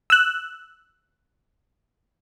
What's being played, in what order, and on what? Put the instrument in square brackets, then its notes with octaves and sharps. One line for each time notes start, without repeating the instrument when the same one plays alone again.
[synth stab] E6 F#6